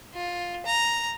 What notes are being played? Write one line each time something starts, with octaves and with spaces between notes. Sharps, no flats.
F4
A#5